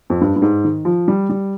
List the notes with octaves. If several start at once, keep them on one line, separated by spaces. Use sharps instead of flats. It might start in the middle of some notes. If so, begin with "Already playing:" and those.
F2
G2
G2
G#2
D#3
F3
G3
G3